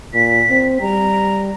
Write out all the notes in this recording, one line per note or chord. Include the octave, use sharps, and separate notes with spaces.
A#2 B6
C4
G3 A#5